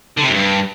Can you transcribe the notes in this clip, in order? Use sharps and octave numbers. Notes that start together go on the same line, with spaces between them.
D3
C3
F#2
G2